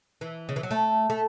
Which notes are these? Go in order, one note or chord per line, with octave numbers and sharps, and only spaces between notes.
E3
C#3
E3
F#3
A3
A3